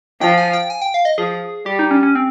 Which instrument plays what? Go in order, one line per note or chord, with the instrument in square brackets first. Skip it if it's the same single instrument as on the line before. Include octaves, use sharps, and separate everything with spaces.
[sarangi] F3 [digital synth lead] G5
[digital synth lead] G#5
G5
G#5
G5
F5
D#5
[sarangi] F3 [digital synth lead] G#4
[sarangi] G3 [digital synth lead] G4
[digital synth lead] D#4
C#4
C#4
C4